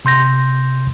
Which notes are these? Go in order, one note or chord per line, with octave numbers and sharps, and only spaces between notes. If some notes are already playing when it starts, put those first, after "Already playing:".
C3 C6 G6 A#6